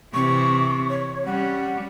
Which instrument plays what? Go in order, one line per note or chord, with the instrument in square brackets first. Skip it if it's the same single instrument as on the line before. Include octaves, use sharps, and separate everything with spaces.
[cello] C3 E3 [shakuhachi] C#6
[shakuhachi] C#5
[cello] G3 C#4 [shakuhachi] F#5